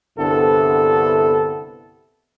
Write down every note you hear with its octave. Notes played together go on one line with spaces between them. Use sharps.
C2 G2 D3 B3 E4 A4